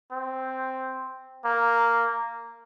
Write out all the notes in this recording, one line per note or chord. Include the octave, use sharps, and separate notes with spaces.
C4
A#3